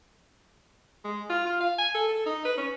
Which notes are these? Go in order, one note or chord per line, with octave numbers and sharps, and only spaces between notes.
G#3
F4
F4
F5
G#5
A4
A4
D#4
B4
C#4